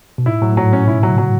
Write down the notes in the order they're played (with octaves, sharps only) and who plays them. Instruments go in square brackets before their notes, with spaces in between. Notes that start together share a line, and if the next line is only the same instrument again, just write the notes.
[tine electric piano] B2
[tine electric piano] A2 [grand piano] E4
[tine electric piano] A2 [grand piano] F#3
[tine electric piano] A2
[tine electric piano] G#2 [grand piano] F#3
[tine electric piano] A2 [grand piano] C#4
[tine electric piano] B2 [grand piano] E4
[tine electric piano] D3 [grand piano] F#3
[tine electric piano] C#3
[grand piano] F#3